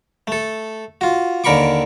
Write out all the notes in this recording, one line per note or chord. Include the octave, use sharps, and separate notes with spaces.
A3 A4
F4 F#4
D#2 D3 A#4 B5 C#6 D6